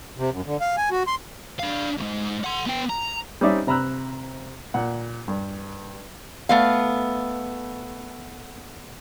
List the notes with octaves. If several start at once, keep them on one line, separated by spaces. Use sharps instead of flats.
C3
F#2
D3
F5
G#5
F#4
C6
D4 F5
C#2 G#2
F#5 C6
B3 G5
A#5
G3 C4 C#4 D#4 D5 E5
C3 A#5 B5 E6 F#6
A#2 F#5
G2
A3 B3 F5